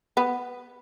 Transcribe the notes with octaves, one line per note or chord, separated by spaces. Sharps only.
B3